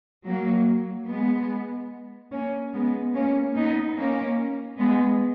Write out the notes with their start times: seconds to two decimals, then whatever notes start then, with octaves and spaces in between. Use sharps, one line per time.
0.26 F#3 A#3
1.08 G#3 B3
2.32 A#3 C#4
2.73 G#3 B3
3.14 A#3 C#4
3.55 B3 D#4
3.97 A#3 C#4
4.79 G#3 B3